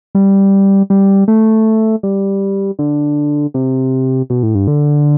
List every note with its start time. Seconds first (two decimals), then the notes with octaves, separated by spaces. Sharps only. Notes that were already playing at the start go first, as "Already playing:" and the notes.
0.15 G3
0.90 G3
1.28 A3
2.03 G3
2.79 D3
3.54 C3
4.30 B2
4.43 A2
4.55 G2
4.67 D3